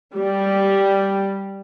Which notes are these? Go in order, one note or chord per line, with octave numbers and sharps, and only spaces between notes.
G3